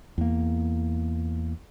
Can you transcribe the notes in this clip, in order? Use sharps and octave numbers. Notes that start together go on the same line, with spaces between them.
E2 A#3